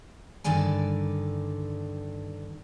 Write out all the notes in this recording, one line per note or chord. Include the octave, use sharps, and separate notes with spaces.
G2 D3 D#3 D5 G#5